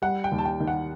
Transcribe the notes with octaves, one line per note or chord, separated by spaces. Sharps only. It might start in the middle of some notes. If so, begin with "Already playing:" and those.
G3 F#5
G5
D#2
A5
G5
D#3
F#5